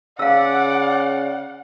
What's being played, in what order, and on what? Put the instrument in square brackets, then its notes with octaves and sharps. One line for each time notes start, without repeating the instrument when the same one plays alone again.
[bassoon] C#3 [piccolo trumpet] D5 [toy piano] F5 E6 [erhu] F#5